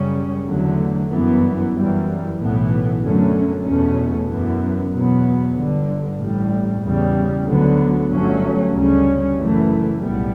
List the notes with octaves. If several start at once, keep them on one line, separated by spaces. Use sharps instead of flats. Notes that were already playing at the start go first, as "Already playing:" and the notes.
Already playing: F#2 C#3 G3 C#4
E2 D3 F#3 A3
G1 F#2 E3 B3
F#2 E3 G3
B1 A2 E3 B3
F#2 D3 F#3 A3 C#4
E2 B2 A3 C#4
F#2 E3 B3
E2 B2 F#3 B3
G1 G2 D3
A1 A2 G3
E2 C#3 G3
D2 D3 F#3 B3
G1 G2 F#3 A3 C#4
D2 C#3 G3 C#4
F#1 F#2 E3 A3
B1 A2 G3 B3